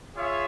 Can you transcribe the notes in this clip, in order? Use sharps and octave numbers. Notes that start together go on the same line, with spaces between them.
F4 G#4 C#5 E5